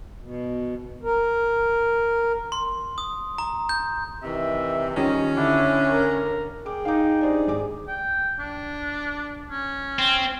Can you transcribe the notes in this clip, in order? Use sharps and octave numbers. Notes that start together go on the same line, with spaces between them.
B2
A#4
C6
D#6
A#5
G6
C3 D#3 E3 E5
D#3 F3 G3 C#4 D#5
D3 D4 E4
A#4
G#4 G5 D6
D#4 F5 D6
D4 G4 G#4 C5 D5
G#1 G#5 D6
G5
D4
C#4
C4